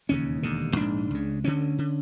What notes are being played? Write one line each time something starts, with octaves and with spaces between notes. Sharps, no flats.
E1 D#2 C#3 C#4
E1 D#2 D3
A#1 G#2 D4
C#2 C#3
D2 D3 C#4
D3